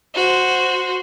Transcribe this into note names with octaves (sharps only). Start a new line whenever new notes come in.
F#4 C5